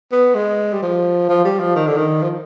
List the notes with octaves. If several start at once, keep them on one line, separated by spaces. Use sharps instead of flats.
B3
G#3
G3
F3
F3
G3
F3
D#3
D3
D#3
F3